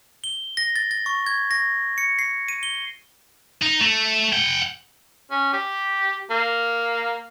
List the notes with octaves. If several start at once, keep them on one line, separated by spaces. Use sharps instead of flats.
G7
A#6
A6
A6
C#6
G#6
A#6
C#7
C7
D#7
G7
D#4
A3
F#5 G5
C#4
G4
A#3